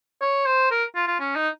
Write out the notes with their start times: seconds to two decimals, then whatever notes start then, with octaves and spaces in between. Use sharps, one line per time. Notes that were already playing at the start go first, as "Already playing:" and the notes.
0.21 C#5
0.46 C5
0.71 A#4
0.95 F4
1.07 F4
1.20 C#4
1.36 D#4